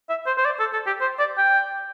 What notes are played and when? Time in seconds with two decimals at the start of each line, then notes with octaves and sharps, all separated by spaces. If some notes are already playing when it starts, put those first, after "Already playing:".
0.09 E5
0.26 C5
0.38 C5
0.45 D5
0.60 A4
0.73 A4
0.87 G4
1.01 C5
1.19 D5
1.38 G5